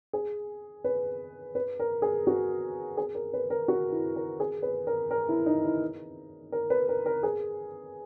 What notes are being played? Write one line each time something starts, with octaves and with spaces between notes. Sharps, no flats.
G#4
B4
B4
A#4
G#4
F#4
G#4
A#4
B4
A#4
F#4
E4
A#4
G#4
B4
A#4
A#4
E4
D#4
E4
A#4
B4
A#4
A#4
G#4